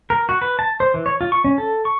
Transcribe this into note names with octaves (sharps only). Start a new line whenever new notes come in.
A#4
F#4
B4
A5
C5
E3
C#5
F4
C#6
C#4
A4
C#6